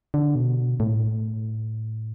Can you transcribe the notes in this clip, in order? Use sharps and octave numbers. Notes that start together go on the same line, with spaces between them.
D3
B2
A2